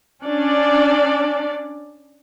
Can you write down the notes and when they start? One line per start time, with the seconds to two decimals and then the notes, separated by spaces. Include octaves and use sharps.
0.23 C#4 D4 D5